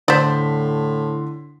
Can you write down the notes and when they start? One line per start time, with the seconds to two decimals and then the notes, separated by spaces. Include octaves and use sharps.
0.08 A2 D3 C5 D5 C6 B6